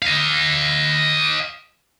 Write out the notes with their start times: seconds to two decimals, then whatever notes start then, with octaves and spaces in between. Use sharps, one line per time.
0.02 D#5 F5